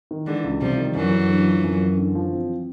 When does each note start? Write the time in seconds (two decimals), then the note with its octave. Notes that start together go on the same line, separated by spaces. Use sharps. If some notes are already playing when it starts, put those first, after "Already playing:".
0.11 D#3
0.27 D3 E3 G#3
0.44 C#2
0.61 C3 F3 G3
0.78 D#3
0.95 F#2 E3 F#3
1.12 F#2
1.29 D3
1.47 F3
1.64 F#2
1.81 F#2
1.97 D3
2.15 F3
2.32 C4